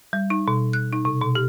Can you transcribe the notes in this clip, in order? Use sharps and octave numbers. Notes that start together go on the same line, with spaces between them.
G3
D#4
B2
F#6
D#4
C3
B2
G4